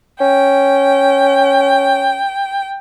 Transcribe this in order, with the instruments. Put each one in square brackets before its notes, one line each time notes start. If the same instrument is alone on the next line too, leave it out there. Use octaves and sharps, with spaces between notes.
[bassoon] C#4 [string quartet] G5